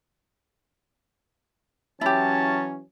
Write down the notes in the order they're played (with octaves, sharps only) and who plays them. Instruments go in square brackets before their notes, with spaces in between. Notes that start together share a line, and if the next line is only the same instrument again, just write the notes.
[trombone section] E3 F#3 C#4 [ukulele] E4 G4 [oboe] A5